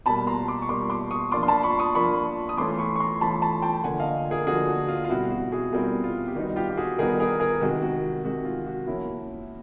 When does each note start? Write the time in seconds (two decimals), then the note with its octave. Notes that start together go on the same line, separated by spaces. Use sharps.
0.06 B2 G3 A#3 A5 B5
0.27 A#5 C6
0.48 C6 D6
0.62 C#6
0.69 B2 G3 A#3 C6 D6
0.90 C6 D6
1.11 C#6 D#6
1.32 F3 A#3 D4 F4 C6 D6
1.43 C6
1.48 A5 B5
1.63 B5 C#6
1.79 C#6 D#6
1.95 F3 A#3 D4 F4 B5 C#6
2.49 D#6
2.57 E3 A3 C#4 F4 C6 D6
2.79 B5 C#6
2.96 C#6
3.00 A#5 C6
3.21 E3 A3 C#4 F4 A5 B5
3.42 A5 B5
3.62 G5 A5
3.83 D3 F3 A#3 F#5 G#5
4.00 D#5 F5
4.31 G#4 A#4
4.47 D3 F3 A#3 F#4 G#4
4.67 F#4
4.88 F4
5.04 F4
5.09 B2 G3 C4 E4 F#4
5.31 F#4
5.52 F#4 G#4
5.72 B2 G3 C4 E4 G#4 A#4
6.04 F4
6.27 G4
6.35 D#3 G3 B3 D#4 F#4
6.56 F4 G4
6.69 G4
6.77 F#4 G#4
6.98 D#3 G3 B3 D#4 G#4 A#4
7.20 G#4 A#4
7.40 G#4 A#4
7.61 C3 D#3 G#3 F#4
7.82 F#4
8.24 C3 D#3 G#3 F#4
8.45 F4
8.66 F#4
8.87 F3 A#3 C#4 E4